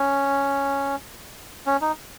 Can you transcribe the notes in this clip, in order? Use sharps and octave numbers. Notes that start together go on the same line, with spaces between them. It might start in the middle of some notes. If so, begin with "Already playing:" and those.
Already playing: C#4
C#4
D#4